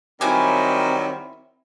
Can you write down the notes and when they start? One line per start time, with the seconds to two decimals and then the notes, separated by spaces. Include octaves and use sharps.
0.21 D#3 F#3 G3 C4 E4 G#5 D6